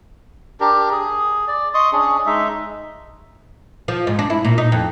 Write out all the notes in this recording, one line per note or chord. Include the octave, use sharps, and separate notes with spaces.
D4 G4 A#4
G#4
D5
D#5 C6 C#6 D#6
C#4 D4 G#4
G#3 D#4 E5
F3
G#2
D4
E4
A#2
D#4
F2